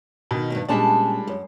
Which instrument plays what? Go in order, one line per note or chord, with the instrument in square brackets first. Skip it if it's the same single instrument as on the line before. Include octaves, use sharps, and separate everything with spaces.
[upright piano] B2 D#3
[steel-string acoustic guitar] D2 G2
[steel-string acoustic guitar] A#2 C#4 A5 [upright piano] G3 G#3 D4
[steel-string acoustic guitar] F#2